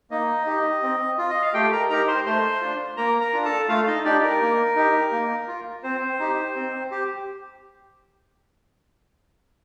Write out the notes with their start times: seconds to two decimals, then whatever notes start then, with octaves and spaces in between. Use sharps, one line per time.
0.10 A#3 D#4 D#5
0.47 D#4 G4
0.83 C4
1.18 F4
1.29 D#5
1.42 F5
1.54 A3 G4 G5
1.72 A#4 A#5
1.90 D#4 G4 A#4 A#5
2.08 C5 C6
2.26 A3 C5 C6
2.61 D4 F4
2.97 A#3 A#4 A#5
3.21 A#4 A#5
3.33 D4 F4
3.45 A4 A5
3.69 A3 F4 F5
3.87 D#4 D#5
4.04 D4 D#4 G4 D5
4.23 A#4
4.41 A#3
4.76 D#4 G4
5.12 A#3
5.48 F4
5.83 C4 C5
6.19 D#4 G4
6.56 C4
6.91 G4